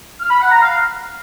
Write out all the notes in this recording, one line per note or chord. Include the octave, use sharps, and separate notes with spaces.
F6
B5
F#5
A#5
F5